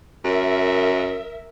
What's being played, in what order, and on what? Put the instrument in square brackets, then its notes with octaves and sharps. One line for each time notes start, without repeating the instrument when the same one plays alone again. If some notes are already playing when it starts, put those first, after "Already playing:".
[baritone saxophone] F#2 [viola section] A#4 E5